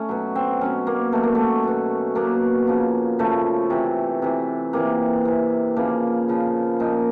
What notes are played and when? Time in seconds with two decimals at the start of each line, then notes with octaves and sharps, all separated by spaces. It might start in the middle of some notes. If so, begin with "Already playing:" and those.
Already playing: A3 C#4 D#4
0.09 B2 F#3
0.35 C4
0.61 B2 F#3 C#4
0.87 A#3
1.12 B2 F#3 A3
1.23 A#3
1.35 A3
1.63 B2 F#3
2.15 B2 F#3 A#3
2.67 C#3 F3
3.19 C#3 F3 A3
3.70 C3 E3
4.22 C3 E3
4.73 C3 E3 A#3
5.25 C3 E3
5.76 C#3 F3 A#3
6.28 C#3 F3
6.80 A#2 F3 D#4